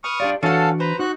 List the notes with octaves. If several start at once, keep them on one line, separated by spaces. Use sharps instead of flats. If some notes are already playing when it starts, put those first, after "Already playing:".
B4 C#6 D#6 F6
D4 F4 G4 D5
E3 C#4 D4 F#4 A4 F5 F#5 A5
B4 C5 A#5
D#4 F#4 F#6